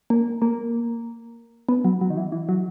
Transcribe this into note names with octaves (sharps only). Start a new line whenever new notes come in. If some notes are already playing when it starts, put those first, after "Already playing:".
A#3
A#3
B3
F#3
F#3
D#3
E3
E3
F#3